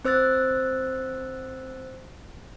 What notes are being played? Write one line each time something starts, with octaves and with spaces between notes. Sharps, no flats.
C4 C5 E6 F#6 A6